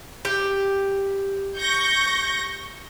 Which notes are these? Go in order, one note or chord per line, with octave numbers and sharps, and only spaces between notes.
G4
C#6 G6 A#6